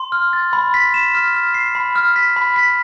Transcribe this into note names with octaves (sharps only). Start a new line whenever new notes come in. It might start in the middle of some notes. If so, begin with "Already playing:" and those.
Already playing: C6
F6
A6
B5
B6
E7
F6
F6
C7
B5
F6
B6
B5
B6